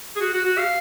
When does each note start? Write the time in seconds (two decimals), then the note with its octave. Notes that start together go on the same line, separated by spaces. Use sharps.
0.16 G#4
0.20 F#4
0.33 F#4
0.45 F#4
0.58 F5